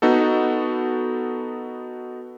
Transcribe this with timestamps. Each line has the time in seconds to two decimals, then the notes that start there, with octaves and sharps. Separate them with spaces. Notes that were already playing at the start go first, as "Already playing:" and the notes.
0.02 B3 D#4 F#4 A4